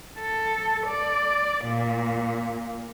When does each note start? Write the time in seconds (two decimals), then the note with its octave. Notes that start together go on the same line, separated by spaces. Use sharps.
0.19 A4
0.87 D5
1.66 A#2